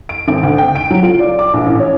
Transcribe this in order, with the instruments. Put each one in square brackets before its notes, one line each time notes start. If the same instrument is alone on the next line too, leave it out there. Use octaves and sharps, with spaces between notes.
[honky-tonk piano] D7
G#1
D2
G5
D7
F#3
F4
D5
D6
A#1
A1
C#5